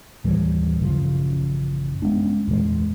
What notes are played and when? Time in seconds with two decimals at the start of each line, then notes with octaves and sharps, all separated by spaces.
0.24 D#2 A2 E3 G3
0.81 A1 F#2 C#3 F3
2.02 G#3 B3 C#4 D4
2.47 E2 A#2 E3 G#3